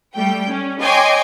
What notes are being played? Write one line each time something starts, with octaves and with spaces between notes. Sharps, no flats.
G3 A3 G5
C#4
C#5 D#5 G5 G#5 C6 D6